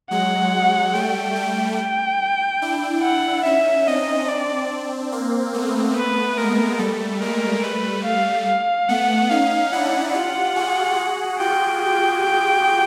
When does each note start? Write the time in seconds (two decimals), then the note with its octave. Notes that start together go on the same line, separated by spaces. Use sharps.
0.10 F#3 G#3 F#5
0.94 G3 A3 G5
1.36 G3 A3
1.78 G5
2.62 D4 E4
3.03 F#5
3.45 C#4 D#4 E5
3.87 C4 D4 D#5
4.29 D5
5.12 A#3 C4
5.54 A3 B3
5.96 B4
6.38 G#3 A#3 A#4
6.79 G3 A3 A4
7.21 G#3 A#3 A#4
7.63 G3 A3 B4
8.05 F5
8.47 F5
8.88 A3 B3 F#5
9.30 C#4 D#4 F5
9.72 D4 E4 F#5
10.14 F4 G4 F#5
10.56 F#4 G#4
10.97 F#4 G#4
11.40 F4 G4 G5
11.81 G5
12.23 G5